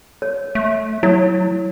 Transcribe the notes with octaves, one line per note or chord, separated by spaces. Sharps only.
C#5
A3
F#3 E4 C#5